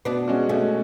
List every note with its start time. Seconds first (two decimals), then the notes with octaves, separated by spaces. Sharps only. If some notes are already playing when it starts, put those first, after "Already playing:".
0.05 B2 B3 D4
0.28 G#3 C#4 F#4
0.49 B2 A3 C#4